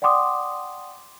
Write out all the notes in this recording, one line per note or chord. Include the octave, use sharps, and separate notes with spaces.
D5 F#5 G5 C6 D6 D#6